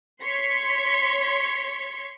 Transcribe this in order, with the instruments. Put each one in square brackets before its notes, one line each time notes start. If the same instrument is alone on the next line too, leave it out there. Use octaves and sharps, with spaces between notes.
[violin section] C#5 C6 C#6 B6